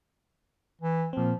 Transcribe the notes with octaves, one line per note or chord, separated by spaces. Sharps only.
E3
A#2 F3 C4